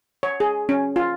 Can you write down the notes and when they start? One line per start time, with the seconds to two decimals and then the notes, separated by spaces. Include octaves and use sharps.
0.23 C#5
0.40 G#4
0.69 C#4
0.96 F4